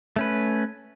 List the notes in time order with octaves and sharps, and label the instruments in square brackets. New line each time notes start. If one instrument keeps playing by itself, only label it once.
[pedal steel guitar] A3 C#4 B4